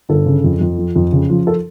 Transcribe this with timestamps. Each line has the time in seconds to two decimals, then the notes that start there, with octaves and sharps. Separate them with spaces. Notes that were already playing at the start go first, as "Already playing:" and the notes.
0.09 G1 A4
0.26 C#3
0.44 F2
0.61 F2
0.78 F3
0.96 F2
1.12 C#3
1.30 F3
1.47 A4